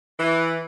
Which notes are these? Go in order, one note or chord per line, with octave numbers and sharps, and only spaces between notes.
E3